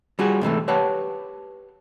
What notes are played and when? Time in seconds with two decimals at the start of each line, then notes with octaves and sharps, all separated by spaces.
0.19 G3 F4 F#4 G#4
0.41 G#2 C3 E3 A3
0.68 G4 B4 C#5 F#5 A5